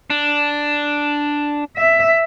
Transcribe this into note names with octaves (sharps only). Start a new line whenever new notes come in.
D4
E5